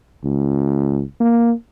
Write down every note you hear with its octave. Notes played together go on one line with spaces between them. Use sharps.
C#2
A#3